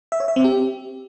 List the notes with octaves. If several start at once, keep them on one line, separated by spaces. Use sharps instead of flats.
E5
C#5
E5
C4
G4